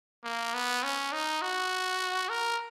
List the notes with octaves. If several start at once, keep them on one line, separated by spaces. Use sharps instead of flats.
A#3
B3
C#4
D#4
F#4
A#4